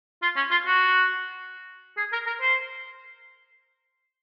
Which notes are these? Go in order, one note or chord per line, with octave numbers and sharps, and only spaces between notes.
F4
C#4
F4
F#4
G#4
A#4
A#4
C5